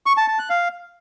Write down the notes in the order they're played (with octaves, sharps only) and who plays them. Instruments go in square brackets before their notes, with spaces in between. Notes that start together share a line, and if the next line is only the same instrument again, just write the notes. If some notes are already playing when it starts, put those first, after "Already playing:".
[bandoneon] C#6
A5
A5
F#6
F5